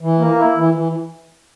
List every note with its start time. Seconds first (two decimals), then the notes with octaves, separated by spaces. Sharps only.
0.01 E3
0.19 A#3
0.37 E4
0.56 E3
0.74 E3